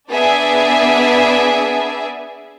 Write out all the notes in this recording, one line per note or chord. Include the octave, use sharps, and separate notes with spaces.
B3 D4 G#4 D5 E5